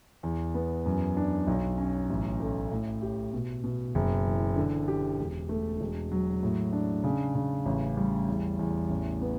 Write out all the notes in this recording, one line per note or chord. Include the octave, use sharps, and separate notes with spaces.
E2
B3
F#2
D4
B1
C#4
A1
A3
A2
G4
B2
B2
F#1
E3
D3
G4
E1
A3
E1
F#3
A2
D4
C#3
C#3
A1
G3
E2
E2
A1
B3